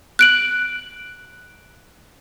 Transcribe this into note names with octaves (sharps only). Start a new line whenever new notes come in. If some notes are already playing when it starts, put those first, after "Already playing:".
F#6 D7 F#7